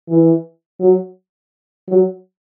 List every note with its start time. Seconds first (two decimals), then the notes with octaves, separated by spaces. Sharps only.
0.08 E3
0.80 F#3
1.88 F#3